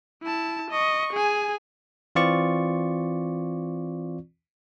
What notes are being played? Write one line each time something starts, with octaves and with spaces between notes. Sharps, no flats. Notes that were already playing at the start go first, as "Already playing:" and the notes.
E4 A5
D#5 C#6
G#4 G#5
E3 C4 F4 D5 C#6